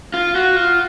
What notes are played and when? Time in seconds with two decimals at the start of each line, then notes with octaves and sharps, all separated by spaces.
0.14 F4
0.35 F#4
0.56 F4